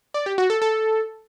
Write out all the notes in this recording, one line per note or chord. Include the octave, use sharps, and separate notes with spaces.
D5
G4
F#4
A4
A4